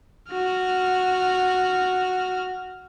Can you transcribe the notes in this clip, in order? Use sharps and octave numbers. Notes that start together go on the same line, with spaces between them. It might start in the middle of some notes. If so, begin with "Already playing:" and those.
F#4 F6